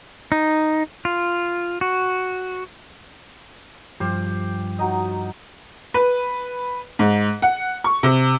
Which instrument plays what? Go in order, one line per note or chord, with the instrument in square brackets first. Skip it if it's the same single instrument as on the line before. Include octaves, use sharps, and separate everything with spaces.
[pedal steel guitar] D#4
F4
F#4
[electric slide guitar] G2 F3 [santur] G4 C5
[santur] F#3 D#4 D#5
[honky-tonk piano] B4
G#2
F#5
C#6
C3